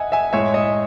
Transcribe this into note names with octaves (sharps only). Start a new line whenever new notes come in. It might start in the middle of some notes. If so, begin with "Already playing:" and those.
Already playing: D#5 E5 F#5 G#5
E5 G#5
A2 G#3 C#5 E5
D#5